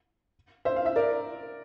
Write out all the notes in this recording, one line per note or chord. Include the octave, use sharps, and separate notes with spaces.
C5 E5
F5
E5
A#4 D5